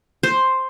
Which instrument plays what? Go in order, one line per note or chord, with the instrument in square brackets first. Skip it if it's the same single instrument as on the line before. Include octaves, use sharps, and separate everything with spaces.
[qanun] C5